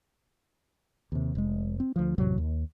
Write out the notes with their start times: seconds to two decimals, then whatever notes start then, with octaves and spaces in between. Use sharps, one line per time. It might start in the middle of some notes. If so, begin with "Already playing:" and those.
1.12 D#2 C3
1.35 F1 G#3
1.80 C4
1.96 D2 F3
2.18 A1 F2 C3 F#3
2.38 D#2